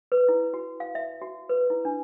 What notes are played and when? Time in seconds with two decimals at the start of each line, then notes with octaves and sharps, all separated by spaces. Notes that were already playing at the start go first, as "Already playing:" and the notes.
0.12 B4
0.29 E4
0.54 F#4
0.80 F5
0.95 E5
1.22 F#4
1.49 B4
1.70 E4
1.85 D4